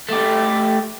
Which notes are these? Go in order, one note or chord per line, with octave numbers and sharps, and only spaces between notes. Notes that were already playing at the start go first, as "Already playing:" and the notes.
A3 G4